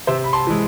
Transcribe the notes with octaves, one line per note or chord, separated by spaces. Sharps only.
C3 C5 E5
B5
A5 C6
E3 G#3